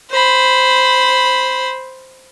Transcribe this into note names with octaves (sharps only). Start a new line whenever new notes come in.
C5 B5